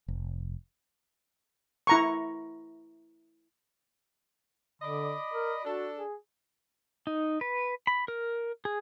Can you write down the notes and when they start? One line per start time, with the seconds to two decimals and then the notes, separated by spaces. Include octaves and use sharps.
0.08 F1
1.87 E4 A#5 C#6
4.82 D3 D5 D#5 B5
5.34 A#4
5.65 D4 F#4 A4
5.97 G#4
7.07 D#4
7.41 B4
7.87 B5
8.08 A#4
8.65 G#4